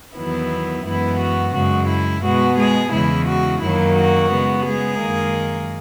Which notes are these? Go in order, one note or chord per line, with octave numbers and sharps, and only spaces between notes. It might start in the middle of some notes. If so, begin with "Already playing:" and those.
E2 D#3 F#3 B3 E4
F#2 E3 G#3 B3 E4
F#4
F#2 C#3 G#3 F#4
E4
B2 G#3 B3 F#4
G#3 G#4
E2 C#3 G#3 E4
F#4
F#2 D#3 F#3 A#3 E4
F#4
C#3 G#3 B3
G#3 G#4
F#2 D#3 A#3